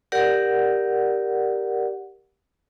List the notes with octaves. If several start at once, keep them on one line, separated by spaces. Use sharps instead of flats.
G4 A#4 D5 F#5